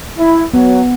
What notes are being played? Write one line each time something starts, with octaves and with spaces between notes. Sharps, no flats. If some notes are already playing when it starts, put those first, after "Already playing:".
E4
F#3 B3